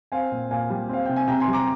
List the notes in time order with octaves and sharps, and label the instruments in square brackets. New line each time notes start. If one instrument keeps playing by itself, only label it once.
[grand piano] C4 F5 G#5
A#2
A#2 F5 G#5
G3
C4 F5
C3 G5
G#5
C3 G5 A#5
G#5 C6
G3
A#5 D6